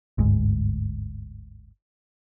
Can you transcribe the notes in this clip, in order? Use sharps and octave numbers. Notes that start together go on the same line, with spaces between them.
G1 D2 G#2